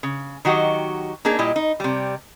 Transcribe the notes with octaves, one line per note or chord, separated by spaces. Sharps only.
C#3
D#3 F#3 F#4 G4 D#5
A#3 D4 D#4 G#4
A#2 G3 E4 D#5
D#4
C3 G3